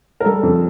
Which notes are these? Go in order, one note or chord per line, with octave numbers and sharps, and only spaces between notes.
A#4
G3 A4
F2